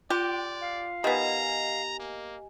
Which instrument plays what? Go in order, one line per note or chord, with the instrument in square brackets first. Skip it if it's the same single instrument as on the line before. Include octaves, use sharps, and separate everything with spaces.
[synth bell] F4 C6 [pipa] G4 [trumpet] D5 [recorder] G5
[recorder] F5
[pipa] D#3 B3 [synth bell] G4 D#5 G#5 [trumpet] A#5
[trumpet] A#3